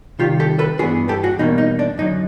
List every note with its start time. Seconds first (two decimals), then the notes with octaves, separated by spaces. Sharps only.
0.19 C3 D#3 G3 F4 G4
0.40 G4 A4
0.59 A4 B4
0.79 G2 E3 G#3 B3 D4 F#4 G#4
1.09 G4 A4
1.23 F#4 G#4
1.38 E2 B2 G3 A#3 D#4
1.58 D#4
1.79 D4
1.98 F#2 D3 F#3 D#4